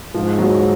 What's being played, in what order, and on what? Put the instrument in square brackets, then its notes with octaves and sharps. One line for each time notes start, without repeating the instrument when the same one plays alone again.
[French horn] G#2 [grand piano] F3
[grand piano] F#3